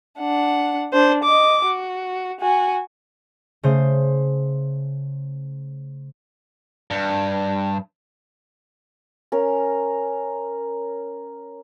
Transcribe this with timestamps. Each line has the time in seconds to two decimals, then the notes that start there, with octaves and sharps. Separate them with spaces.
0.19 D4 F#5
0.93 D4 C5
1.24 D#5 D6
1.65 F#4
2.41 F#4 G#5
3.63 C#3 A3 C5 D#6
6.91 G2
9.32 C#4 A#4